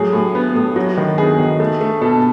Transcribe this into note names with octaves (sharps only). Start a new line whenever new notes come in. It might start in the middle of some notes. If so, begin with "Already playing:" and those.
Already playing: A2 F#3 G#4
A2
B3
A2
F#3 F#4
D#3
B3 G#4
D#3
A3
A3
B2 A4